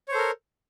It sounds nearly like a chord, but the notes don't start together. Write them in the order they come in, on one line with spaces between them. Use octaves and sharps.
C#5 C5 A4 A#4